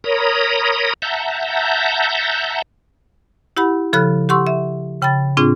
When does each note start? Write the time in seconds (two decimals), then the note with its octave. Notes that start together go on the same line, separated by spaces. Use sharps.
0.04 A#4 C#5 A#5 B5 D#6
1.02 E5 F#5 A5 A#5 G6
3.57 E4 G4 F#5 B5
3.93 C#3 F3 A4 B5 F6 F#6
4.29 G4 F#5 C6 C#6 E6
4.47 E5
5.01 C#3 G5 B5 A6
5.37 A2 C4 D4 F4 G#4